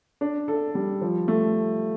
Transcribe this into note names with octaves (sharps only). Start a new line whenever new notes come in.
D4
A4
G3
F3
A3